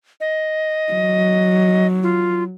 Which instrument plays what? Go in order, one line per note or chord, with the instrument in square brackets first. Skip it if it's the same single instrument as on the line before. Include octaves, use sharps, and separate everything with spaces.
[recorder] D#5
[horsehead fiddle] F#3
[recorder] F4